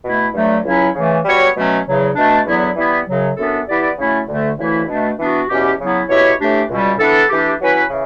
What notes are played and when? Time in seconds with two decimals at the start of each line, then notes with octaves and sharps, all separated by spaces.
0.04 B2 A3 E4
0.34 G2 D3 F#3 A3
0.64 C#2 C#3 F#3 C#4 E4
0.94 C#3 E3 A3
1.24 G3 B3 F#4 C#5
1.55 B2 F#3 A3 C#4
1.85 E2 C#3 F#3
2.15 B2 A3 D4
2.45 E2 D3 F#3 B3 E4
2.76 E3 G3 B3 E4
3.06 F#2 C#3 F#3
3.36 F#2 E3 B3 D4 A4
3.67 E3 B3 E4 G4 D5
3.97 C#3 F#3 A3 C#4 E4
4.28 D2 D3 A3
4.57 D2 C#3 E3 A3 E4
4.87 B2 A3 D4
5.18 E3 B3 D4 F#4
5.48 E2 B2 F#3 C#4 G4
5.79 C#3 F#3 B3 E4
6.09 B2 A3 E4 G4 C#5
6.38 A2 E3 A3 D4 G4
6.69 C#2 B2 G3
6.99 E3 B3 D4 A4
7.29 E3 A3 D4 G4
7.60 F#3 C#4 E4 B4
7.90 C#3 E3